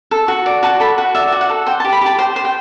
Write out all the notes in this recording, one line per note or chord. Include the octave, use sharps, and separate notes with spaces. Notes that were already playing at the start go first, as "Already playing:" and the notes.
A4
F#4
D5
F#4 A5
A4 B5
F#4 F#5
D5 E5
F#4
F#5
A4
C5 G5
A5
G4
B5
G4 A5
C5 G5
C5
G5